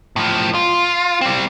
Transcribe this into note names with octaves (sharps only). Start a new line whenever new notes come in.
A2 F3
F4
G3 C4